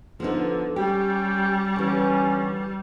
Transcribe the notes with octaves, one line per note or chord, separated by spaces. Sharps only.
D3 F3 B3 D#4
G3 C#4 G4 G5
D3 E3 C#4